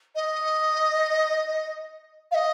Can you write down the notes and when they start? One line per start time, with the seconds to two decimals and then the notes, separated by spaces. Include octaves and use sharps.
0.15 D#5
2.31 F5
2.34 D#5